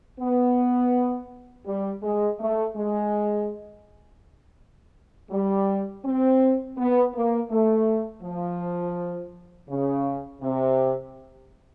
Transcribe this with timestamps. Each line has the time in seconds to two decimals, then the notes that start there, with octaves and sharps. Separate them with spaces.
0.20 B3
1.66 G3
2.03 G#3
2.39 A3
2.76 G#3
5.31 G3
6.04 C4
6.77 B3
7.14 A#3
7.50 A3
8.23 F3
9.69 C#3
10.42 C3